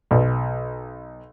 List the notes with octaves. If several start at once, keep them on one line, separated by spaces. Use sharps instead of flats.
B1